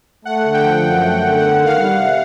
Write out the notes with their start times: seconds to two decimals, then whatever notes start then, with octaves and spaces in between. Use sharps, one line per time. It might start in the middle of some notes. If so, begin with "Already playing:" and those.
0.25 A3 F#5
0.44 D3
0.54 G5
0.63 F3
0.82 F#2
1.00 A3
1.20 D3
1.38 B3 F#5
1.58 D#3
1.66 F5
1.76 G3
1.95 C3